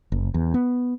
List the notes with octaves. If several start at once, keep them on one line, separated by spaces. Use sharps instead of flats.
F#1
E2
B3